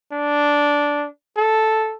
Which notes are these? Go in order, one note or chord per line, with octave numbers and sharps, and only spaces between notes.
D4
A4